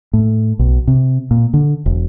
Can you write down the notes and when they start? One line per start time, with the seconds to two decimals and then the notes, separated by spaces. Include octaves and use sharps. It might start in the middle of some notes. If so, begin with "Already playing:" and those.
0.13 A2
0.59 B1
0.87 C3
1.31 A#2
1.54 D3
1.86 E1